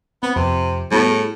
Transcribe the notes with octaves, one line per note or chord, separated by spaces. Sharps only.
B3 C4
F2 C3
A2 G3 B3 F#4
G#4 C#7